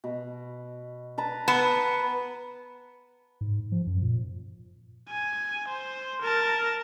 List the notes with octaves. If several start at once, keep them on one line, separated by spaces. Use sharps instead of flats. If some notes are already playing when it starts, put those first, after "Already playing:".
B2
B4 A5 A#5
B3
G#2
F3
F#2
A#2
G#5
C5
A#4 A5